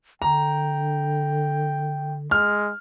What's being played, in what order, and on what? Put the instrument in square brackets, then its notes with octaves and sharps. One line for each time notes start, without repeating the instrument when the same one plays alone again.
[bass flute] D3 [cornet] G5 [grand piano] A#5
[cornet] G#3 [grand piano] F6